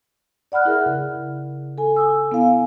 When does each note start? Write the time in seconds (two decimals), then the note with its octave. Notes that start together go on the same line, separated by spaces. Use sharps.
0.52 D5 F#5 B5 F6 F#6
0.65 E4 G#4 A#4 E5
0.86 C#3
1.78 A4 G#5
1.96 G#5 D#6 E6
2.32 B3 E4 F5 G#5